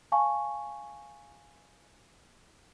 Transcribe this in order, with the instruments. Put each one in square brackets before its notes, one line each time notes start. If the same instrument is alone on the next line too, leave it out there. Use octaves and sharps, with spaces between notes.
[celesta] F5 G#5 A5 C#6